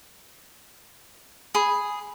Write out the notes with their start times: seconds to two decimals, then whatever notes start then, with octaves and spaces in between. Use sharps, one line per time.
1.55 G#4 B5